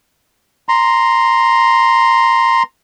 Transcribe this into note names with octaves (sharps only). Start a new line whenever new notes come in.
A#5 C6